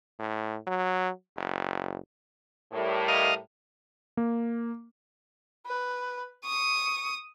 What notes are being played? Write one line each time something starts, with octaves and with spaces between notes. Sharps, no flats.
A2
F#3
F#1
A2 G3 A#4
D#5 F5
A#3
B4
C#6 D#6